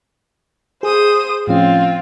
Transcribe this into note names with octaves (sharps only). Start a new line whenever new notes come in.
G#4 C5 D#6
A2 F3 C4 C#4 F4